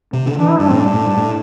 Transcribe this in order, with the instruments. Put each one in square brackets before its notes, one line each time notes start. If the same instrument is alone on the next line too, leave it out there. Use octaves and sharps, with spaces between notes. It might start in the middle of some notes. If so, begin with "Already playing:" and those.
[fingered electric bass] C3
D3
[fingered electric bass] E3 [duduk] D4
[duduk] E4
[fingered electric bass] G2 [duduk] D4
[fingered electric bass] A2 [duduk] C4
[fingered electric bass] G2 [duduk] D4
[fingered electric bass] A2
G2
A2